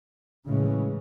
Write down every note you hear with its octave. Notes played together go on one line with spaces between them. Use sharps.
A2 C#3 E3 G#3 C#4